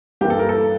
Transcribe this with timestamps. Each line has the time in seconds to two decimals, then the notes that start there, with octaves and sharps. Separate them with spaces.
0.21 G2 E3 A#3 G4
0.30 A4
0.39 A#4
0.49 A4